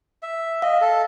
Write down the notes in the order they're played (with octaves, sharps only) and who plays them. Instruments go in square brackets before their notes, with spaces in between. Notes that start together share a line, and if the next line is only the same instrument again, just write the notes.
[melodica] E5
[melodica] D#5 [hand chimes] F5
[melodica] A4